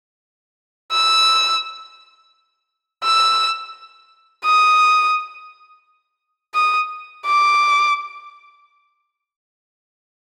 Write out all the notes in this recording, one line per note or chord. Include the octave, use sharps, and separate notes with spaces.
E6
E6
D#6
D#6
D6